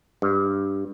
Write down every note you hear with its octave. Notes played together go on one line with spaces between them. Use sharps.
G2